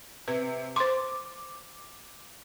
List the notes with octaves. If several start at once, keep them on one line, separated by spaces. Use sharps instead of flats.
C3 B4
C5 C6 D6